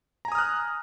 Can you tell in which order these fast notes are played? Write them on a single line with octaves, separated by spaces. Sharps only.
A#5 G#5 D#6 F6 F#6